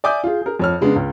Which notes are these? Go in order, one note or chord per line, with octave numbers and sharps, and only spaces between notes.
D5 E5 G#5 D6 D#6 G6
F4 G#4
G#4 A#4
F2 C#5 F6
C#3 G#3 B3 D4
C#2